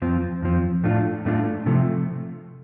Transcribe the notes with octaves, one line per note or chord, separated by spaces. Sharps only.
F2 F3 C4
F2 F3 C4
A2 A3 D4 F4
A2 A3 D4 F4
C3 F3 A3